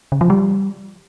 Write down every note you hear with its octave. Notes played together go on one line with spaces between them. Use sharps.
C#3
F3
G3